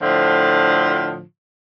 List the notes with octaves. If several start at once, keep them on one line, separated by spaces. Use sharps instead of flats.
A2 D3 F3